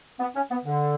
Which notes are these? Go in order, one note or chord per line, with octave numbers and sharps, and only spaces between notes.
B3
C#4
B3
D3